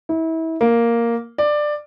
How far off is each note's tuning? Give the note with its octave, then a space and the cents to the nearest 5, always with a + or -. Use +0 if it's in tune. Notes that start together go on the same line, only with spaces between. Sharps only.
E4 -30
A#3 +0
D5 +15